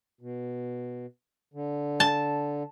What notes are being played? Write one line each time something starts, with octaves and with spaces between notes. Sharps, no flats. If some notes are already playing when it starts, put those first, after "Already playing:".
B2
D3
A5